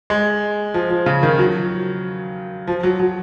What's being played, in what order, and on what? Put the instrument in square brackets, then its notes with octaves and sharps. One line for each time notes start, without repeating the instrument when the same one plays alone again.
[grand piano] G#3
F3
F3
C#3
D#3
F#3
F3
F#3
F#3